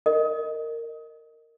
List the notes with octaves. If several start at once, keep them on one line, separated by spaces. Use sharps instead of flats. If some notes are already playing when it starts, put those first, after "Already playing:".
A#4 D#5